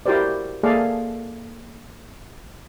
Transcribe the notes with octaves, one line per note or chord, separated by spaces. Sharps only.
E4 F#4 G4 A#4 C5 D5
A#3 G#4 A4 D5 E5 F5